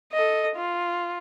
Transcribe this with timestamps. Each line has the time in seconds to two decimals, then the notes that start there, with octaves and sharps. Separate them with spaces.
0.13 A4 D#5
0.56 F4